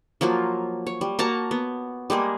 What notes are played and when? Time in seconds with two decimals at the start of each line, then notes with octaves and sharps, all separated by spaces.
0.21 F3 F#3 A#3 F4
0.87 C#5
1.01 G3
1.19 A#3 F#4 A5 A#5
1.51 B3
2.10 G3 G#3 A#3 G#4